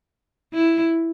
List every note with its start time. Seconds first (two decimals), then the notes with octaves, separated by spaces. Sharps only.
0.54 E4